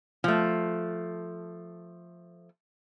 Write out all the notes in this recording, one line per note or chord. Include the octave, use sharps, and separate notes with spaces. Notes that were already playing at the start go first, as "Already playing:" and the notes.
F3 A3